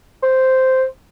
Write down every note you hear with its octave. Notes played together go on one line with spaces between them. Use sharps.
C5